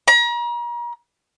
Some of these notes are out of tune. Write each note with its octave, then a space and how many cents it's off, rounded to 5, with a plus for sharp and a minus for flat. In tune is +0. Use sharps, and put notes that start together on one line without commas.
A#5 +40